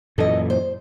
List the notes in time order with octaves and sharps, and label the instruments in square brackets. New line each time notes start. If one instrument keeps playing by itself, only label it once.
[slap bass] F#2 A#2 E3 [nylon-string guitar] A4 D#5
[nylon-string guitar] C5